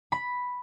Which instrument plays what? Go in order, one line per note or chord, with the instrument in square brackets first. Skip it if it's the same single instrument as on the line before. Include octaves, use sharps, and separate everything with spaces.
[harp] B5